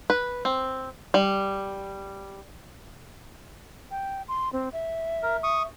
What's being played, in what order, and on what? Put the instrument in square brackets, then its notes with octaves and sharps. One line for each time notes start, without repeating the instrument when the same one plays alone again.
[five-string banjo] B4
C4
G3
[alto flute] G5
C6
C4
E5
[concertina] A#4
C#6 D#6